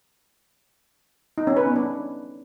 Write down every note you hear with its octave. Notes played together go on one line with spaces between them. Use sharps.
D#4
C#4
B4
B3
D4